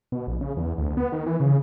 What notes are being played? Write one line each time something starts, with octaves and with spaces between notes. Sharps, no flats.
B2
A#1
C#3
E2
D2
B3
D#3
E3
C#3